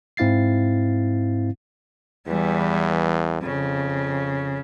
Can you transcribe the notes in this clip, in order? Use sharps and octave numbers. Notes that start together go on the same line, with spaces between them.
G#2 C4 E4 F5 A6 C7
E2 E3 G3
F2 C#3